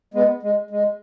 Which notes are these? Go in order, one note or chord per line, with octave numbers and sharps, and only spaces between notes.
G#3 B3
G#3
G#3